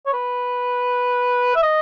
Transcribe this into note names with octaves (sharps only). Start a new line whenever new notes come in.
C#5
B4
E5
D#5